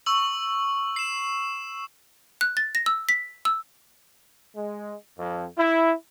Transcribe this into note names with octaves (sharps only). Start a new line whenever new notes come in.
C#6 E6 F#7
C7 E7
F#6
A6
A#6
E6
B6
E6
G#3
F2
E4